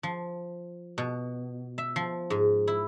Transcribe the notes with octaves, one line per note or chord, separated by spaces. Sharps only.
F3
B2
E5
F3
G#2
E4